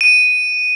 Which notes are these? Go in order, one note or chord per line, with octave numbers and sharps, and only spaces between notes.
D#7